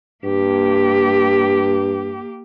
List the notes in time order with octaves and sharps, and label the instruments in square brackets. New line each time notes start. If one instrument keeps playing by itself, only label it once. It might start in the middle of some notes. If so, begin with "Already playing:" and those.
[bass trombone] G2 [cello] A#3 G4